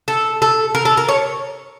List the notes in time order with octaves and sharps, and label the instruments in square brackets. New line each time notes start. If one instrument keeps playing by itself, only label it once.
[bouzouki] A4
A4
A#4
A4
A#4
C#5